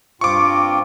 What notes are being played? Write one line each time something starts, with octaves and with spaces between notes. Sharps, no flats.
G2 C4 F4 C#6 D6